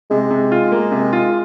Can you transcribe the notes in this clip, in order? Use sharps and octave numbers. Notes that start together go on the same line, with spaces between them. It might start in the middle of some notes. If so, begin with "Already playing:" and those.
C3 G#3
C3
F4
A#3
C3
F4